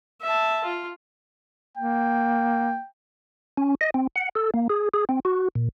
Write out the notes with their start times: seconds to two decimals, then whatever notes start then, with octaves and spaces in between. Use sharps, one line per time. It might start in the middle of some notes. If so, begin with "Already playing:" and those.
0.22 E5 A5
0.64 F4
1.77 A#3 G5
3.57 C#4
3.81 D#5
3.94 C4
4.16 F#5
4.35 A4
4.54 A#3
4.70 G#4
4.94 G#4
5.09 C4
5.25 F#4
5.55 A#2